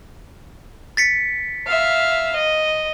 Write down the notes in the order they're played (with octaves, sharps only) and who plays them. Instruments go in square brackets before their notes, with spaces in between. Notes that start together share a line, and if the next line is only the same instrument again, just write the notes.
[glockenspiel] A6 B6 C#7
[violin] E5 F5
D#5